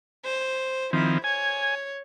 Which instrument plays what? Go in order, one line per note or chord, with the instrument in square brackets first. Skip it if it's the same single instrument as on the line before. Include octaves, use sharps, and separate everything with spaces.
[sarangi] C5
[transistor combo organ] D#3 F3 C4 [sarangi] E4
[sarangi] C#5 [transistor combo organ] G#5